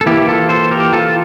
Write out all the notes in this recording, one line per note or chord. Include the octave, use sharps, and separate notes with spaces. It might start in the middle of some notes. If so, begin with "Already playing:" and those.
A4
E3 A#3 E4 G4
F4 A4
A4 C5
G4 A#4
F4 A4